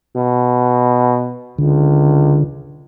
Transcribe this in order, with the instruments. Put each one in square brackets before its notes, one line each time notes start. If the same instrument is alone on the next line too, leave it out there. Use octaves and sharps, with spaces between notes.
[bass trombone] B2
[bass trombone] C#2 [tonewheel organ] D3